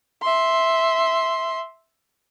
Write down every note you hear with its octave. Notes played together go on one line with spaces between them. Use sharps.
E5 C6